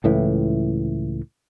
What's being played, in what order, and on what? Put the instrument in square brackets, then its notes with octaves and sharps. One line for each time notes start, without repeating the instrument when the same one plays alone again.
[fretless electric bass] C#2 A2 E3